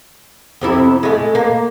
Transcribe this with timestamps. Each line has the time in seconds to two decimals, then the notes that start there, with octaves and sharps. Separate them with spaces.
0.61 F2 C3 E4
1.03 G#3 A3
1.35 A#3